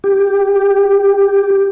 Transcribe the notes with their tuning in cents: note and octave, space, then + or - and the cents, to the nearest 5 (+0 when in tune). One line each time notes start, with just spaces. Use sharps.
G4 +10